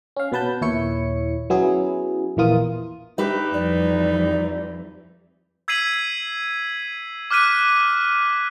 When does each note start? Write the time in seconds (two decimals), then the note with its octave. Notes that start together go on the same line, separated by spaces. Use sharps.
0.16 C#4 F5
0.32 B2 B3 B4 A5 G6
0.61 D#2 A#2 E4 C#5 C#7
1.50 F#3 B3 C#4 E4 G#4
2.37 A#1 E2 E3 A#3 F4 D#6
3.18 D4 D#4 G4 B4 E5
3.54 F2 E3 G3 D5
5.68 E6 G#6 B6 C7 D#7 F#7
7.31 D6 F6 F#6 B6 D#7